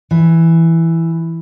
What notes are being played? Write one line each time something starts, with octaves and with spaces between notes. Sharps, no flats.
E3